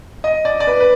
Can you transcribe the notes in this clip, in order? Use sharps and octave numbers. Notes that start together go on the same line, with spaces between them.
D#5
D5
D5
B4
B4